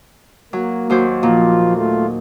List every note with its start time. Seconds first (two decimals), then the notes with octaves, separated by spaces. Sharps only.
0.53 F#3 A#3
0.90 D#2 F#3 C5
1.23 A#2 F3 F4
1.75 A3 F4